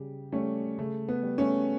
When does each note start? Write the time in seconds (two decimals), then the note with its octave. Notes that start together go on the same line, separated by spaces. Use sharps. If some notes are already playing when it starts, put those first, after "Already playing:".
Already playing: C#3 G3 G4
0.33 G3 A3 C#4
0.78 C#3 A3
1.08 B3
1.23 G3
1.38 A3 C#4